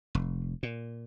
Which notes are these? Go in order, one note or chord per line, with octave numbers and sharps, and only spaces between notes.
F1
A#2